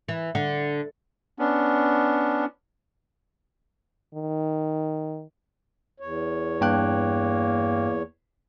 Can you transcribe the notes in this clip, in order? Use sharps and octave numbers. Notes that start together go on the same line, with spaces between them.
E3
D3
B3 C#4 D4
D#3
E2 C#5
G2 A#3 G5 F#6